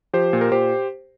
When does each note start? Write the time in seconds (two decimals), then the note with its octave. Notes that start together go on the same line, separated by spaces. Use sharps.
0.13 F3 G4 C5
0.33 A#2
0.41 A#4
0.51 A#2 G4 C5